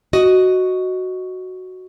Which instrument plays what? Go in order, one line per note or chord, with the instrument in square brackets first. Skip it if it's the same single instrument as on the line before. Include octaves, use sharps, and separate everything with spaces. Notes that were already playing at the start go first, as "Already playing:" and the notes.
[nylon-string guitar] F#4 D#5